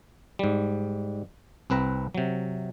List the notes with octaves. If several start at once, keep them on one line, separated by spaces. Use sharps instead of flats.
G#2 G3
C2 C4 B4 A#5
C3 F#3